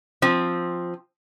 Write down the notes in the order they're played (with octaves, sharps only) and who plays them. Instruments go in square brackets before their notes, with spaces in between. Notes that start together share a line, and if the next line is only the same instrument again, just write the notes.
[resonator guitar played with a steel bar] F3 C4